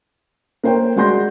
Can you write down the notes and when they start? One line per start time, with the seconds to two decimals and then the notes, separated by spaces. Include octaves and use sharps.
0.63 A#3 A#4 C5 C#5 G5
0.96 G#3 F#4 D5 C6 G6 A#6